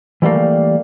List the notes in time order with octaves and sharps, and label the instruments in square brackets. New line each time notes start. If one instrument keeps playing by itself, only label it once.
[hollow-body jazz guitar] E3 G3 A3 A#3